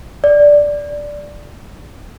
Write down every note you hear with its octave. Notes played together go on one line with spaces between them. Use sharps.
D5